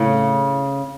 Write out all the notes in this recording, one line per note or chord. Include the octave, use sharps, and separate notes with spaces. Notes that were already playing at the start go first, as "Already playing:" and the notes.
Already playing: A2 C#3